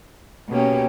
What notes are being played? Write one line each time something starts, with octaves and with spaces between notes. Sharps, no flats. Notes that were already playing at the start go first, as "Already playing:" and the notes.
B2 A#3 C#4 G4